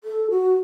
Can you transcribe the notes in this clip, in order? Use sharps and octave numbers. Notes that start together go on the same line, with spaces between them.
A4
F#4